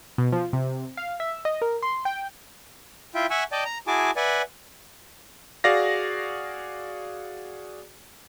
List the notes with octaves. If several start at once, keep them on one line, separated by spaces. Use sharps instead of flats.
B2
F3
C3
F5
E5
D#5
A#4
C6
G5
E4 F4 E5 G5
E5 F#5 G#5 C#6 E6
D5 D#5 G5 A5
A#5
E4 F#4 G#4 G#5 A5 D6
B4 D5 E5 F#5 G#5
F#4 G#4 D5 F5 A#6